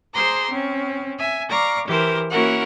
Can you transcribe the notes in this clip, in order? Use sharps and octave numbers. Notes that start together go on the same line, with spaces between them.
G#4 C5 A#5 C6 D6
C4 C#4
E5 G#5
D5 F5 A#5 C#6 D6
E3 G4 A#4 C5
A#3 C#4 E4 F#4 A#4 F#5